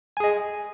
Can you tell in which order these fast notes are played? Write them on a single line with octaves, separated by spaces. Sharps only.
G#5 G#4 D#5